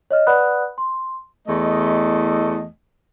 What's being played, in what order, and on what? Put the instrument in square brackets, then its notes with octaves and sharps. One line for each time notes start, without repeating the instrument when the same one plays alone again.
[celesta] C#5 D#5 F6
B4 D5 F#5 B5 D#6 F#6
C6
[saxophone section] E2 A3 D#5